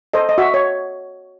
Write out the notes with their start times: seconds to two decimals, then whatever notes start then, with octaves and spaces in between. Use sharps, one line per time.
0.14 A4 C5 D#5
0.29 D#5
0.38 F#4 E5
0.54 C#5